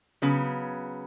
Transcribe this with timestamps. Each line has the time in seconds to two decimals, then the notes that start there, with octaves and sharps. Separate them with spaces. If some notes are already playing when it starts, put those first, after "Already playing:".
0.22 C#3 F#3 B3